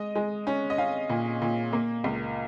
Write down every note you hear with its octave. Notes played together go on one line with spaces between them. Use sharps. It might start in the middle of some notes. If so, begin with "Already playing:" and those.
Already playing: G#3 D#5
G#3
C#4
D#5
C#4 F5
A#2
A#2
A#3
C#2